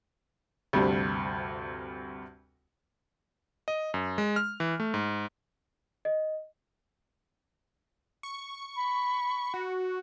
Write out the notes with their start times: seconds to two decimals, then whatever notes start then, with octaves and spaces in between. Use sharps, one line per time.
0.73 D2 G2 C3 G3
3.68 D#5
3.94 F#2
4.18 G#3
4.36 F6
4.60 E3
4.80 A3
4.94 G#2
6.05 D#5
8.23 C#6
8.76 B5
9.54 F#4